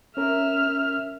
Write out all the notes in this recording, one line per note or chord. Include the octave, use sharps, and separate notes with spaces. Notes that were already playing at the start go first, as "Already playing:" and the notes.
C#4 A#4 E5 F6